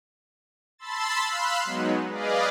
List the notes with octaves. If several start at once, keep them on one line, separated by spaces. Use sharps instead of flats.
A5 B5 C6 E6 A6
F5 B5 C6 E6 F#6
F#3 G#3 B3 D#4
G#4 B4 D5 D#5 F5